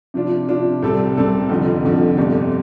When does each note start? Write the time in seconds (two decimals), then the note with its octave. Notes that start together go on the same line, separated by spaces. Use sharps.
0.14 C3 F3 D4 F4
0.48 C3 F3 D4 F4
0.83 C2 C3 G3 C4 A4
1.16 C2 C3 G3 C4 A4
1.49 F1 F2 D3 F3
1.83 F1 F2 D3 F3
2.17 G1 F2 C3 G3